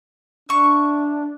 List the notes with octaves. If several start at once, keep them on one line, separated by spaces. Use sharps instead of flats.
D4 E5 C#6